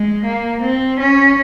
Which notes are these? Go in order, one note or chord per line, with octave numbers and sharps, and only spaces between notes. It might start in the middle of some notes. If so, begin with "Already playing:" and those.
Already playing: G#3
A#3
C4
C#4